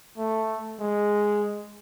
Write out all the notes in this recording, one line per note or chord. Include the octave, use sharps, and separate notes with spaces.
A3
G#3